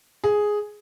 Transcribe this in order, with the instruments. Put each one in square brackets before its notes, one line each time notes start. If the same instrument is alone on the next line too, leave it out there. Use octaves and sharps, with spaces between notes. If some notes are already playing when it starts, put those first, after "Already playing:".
[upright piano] G#4